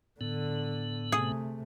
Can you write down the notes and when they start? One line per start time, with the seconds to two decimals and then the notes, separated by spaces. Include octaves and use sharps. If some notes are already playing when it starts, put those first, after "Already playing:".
0.21 A2 D3 B3
1.12 C3 A3 G#4